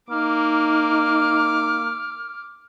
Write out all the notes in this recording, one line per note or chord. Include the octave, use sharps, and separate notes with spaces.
A#3 D#4 D6 F6